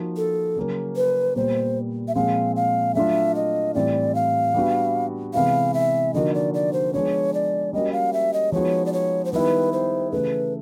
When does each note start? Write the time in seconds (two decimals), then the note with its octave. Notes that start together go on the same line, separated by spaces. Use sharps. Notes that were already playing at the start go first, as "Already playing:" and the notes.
Already playing: F3 A#3 D#4 F#4
0.17 A4
0.56 C#3 F#3 A#3 C#4
0.96 B4
1.36 A#2 G3 B3 C5
2.08 E5
2.15 A#2 F3 G#3 C4 F5
2.56 F5
2.95 F#3 A3 D4 F4 E5
3.35 D#5
3.74 A2 E3 G3 C4 D5
4.15 F5
4.54 G3 B3 D4 F#4
5.34 C3 E3 G#3 B3 E4 F5
5.74 E5
6.14 D3 F3 A#3 D#4 F#4 D#5
6.34 D5
6.54 D5
6.73 C5
6.94 F3 G#3 B3 D4 C#5
7.34 D5
7.73 G3 A#3 C#4 F#4 D#5
7.93 F5
8.13 E5
8.33 D#5
8.52 F3 G#3 B3 D#4 F#4 C#5
8.86 D5
8.93 C#5
9.25 C5
9.33 D#3 G3 B3 E4 B4
9.73 C5
10.12 C#3 E3 A3 B4